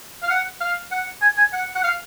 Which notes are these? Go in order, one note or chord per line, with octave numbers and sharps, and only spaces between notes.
F5
F#5
F5
F#5
G#5
G#5
F#5
F#5
F5